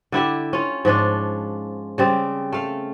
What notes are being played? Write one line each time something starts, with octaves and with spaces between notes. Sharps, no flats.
D3 E4 G4 E5
C#4 F4
G#2 F3 C#4 D4
C#3 G3 C4
A3 F5